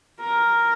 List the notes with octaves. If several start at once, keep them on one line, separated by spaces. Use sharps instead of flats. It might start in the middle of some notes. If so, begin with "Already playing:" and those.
A#4